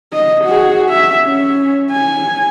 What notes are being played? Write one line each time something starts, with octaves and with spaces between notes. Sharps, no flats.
D#5
F#4 G#4
E5
C#4
G#5